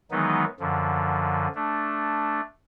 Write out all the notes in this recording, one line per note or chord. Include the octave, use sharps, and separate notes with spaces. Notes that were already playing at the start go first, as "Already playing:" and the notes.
D#3 E3 F#3 G#3 B3 D#4
F#2 D3 F3
A3 D4